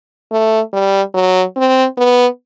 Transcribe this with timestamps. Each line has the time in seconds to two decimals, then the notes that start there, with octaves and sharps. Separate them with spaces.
0.32 A3
0.73 G3
1.14 F#3
1.56 C4
1.97 B3